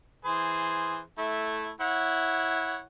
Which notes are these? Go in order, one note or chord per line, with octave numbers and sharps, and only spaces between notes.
E3 G#4 C5
A3 E4
E4 C#5 F#5